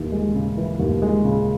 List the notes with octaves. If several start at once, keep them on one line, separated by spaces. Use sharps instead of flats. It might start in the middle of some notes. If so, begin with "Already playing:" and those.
Already playing: D#2 E3
G#3
C#3
E3
D#2
G#3
C#3